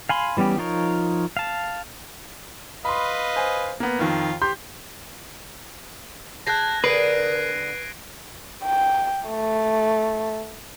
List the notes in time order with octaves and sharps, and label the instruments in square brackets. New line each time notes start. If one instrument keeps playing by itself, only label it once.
[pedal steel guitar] F5 G#5 B5 C6
E3 G3 B3 C#4 G4
F3 D#4 F4 A#4 C#5
F5 A5
[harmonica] B4 D#5 F5 [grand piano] B5 C6
[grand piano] C5 G#5
A#3 B3
[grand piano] F2 D#3 [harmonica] F4
[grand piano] G4 C6 G6
[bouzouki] G#4 G5 [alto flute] A5 [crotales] F#6 G#6 A#6
[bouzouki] D3 G#4 [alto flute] A#4 [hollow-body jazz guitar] B4 [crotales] C7 D7 D#7
[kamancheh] G5
A3